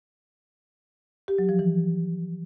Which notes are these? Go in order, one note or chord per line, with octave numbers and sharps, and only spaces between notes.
G4
F#3
F3
E3